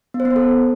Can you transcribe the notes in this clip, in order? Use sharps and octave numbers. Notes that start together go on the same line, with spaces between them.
B3
C5
B3
C5
A4